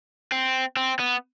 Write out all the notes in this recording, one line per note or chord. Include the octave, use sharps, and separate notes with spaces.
C4
C4
B3